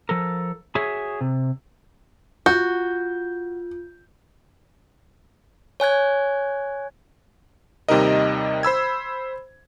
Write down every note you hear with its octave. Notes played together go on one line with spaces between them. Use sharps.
F3 A4 A#4
F#4 G#4 C#5 E5
C3
F4 F#4 G6
C#5 G#5 F#6 G#6
D#2 C3 G3 D#4 A#4 D#5
C5 B5 E6 G#6